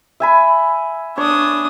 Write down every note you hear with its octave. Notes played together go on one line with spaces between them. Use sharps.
E5 G#5 B5
D4 C#5 D#6